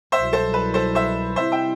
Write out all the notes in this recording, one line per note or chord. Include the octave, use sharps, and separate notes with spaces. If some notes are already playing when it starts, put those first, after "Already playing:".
C2 B2 F#3 C5 E5
A4 C5
B4
A4 C5
C5 E5
C3 G3 C4 E4 C5 E5
E5 G5